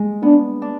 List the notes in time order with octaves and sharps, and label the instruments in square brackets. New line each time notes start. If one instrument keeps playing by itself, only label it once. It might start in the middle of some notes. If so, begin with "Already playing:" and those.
Already playing: [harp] G#3
[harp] B3 [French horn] D4
[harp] D4